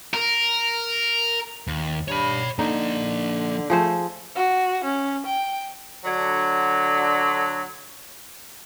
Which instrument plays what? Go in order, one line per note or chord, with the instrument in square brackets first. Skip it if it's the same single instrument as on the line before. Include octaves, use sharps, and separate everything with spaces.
[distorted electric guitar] A#4
D#2
[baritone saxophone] G2 [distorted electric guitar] C#5 B5
[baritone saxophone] D3 [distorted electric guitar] F3 A#3 [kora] D#4
[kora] F3 G#4 C5 [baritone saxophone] A3
[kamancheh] F#4
C#4
G5
[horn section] D3 F#3